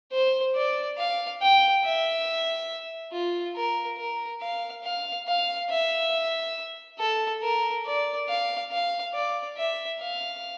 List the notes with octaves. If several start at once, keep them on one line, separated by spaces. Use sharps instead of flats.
C5
D5
F5
G5
E5
F4
A#4
A#4
F5
F5
F5
E5
A4
A#4
D5
F5
F5
D5
E5
F5